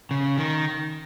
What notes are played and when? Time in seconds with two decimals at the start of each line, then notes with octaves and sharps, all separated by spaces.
0.11 C#3
0.38 D#3